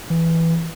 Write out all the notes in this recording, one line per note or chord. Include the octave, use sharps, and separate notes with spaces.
E3